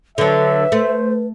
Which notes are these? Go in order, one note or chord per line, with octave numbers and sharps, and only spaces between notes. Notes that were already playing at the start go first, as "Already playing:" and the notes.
D3 F#3 A4 B4 E5
A3 C5